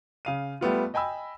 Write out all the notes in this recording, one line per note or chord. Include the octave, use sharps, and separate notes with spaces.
C#3 F5 D#7
G3 A3 B3 F4
D#5 G5 G#5 B5 E6